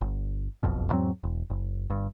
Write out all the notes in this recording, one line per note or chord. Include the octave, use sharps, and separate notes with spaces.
G1
F#1 B1 F2 B2
E2 G#2 F#3 C4
E1
F#1
G1 G2